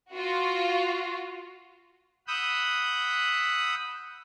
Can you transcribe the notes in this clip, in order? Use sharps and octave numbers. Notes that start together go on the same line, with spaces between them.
F4 F#4
F#5 B5 D#6 E6 F#6 G6